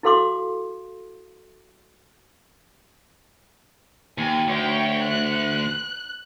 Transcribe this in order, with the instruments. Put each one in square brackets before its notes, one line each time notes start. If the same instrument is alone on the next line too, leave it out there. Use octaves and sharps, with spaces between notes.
[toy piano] E4 F#4 A4 F5 C6 D6
[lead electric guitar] D#2 [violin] G#5
[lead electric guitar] D2 [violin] C#5 G5
[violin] F#6